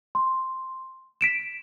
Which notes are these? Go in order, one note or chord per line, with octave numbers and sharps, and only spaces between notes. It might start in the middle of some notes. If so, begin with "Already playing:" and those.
C6
B6 D7 E7